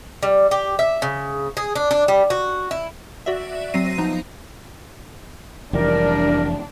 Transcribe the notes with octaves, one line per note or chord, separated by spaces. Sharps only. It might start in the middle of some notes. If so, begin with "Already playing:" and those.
G3
G4
E5
C#3
G#4
D4
D4
G3
F#4
E4
F#4 D5 E5
F#3 C4 A#6 C7 D#7
F3 B3 D#4 A#5
F1 E3 G3 D4 A#4